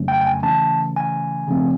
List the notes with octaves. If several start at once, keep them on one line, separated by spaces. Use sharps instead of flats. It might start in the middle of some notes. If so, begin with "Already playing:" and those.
Already playing: F2 C#3 F#3 A3 C#4
G5
G5
G#5
C#3 E3 A3 C#4 A5
G#5
C#3 F3 A3 C4